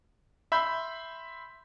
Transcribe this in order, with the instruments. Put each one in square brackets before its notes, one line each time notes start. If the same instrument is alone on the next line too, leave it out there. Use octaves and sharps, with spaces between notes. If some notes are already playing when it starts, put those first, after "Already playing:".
[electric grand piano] E5 B5 C6 G6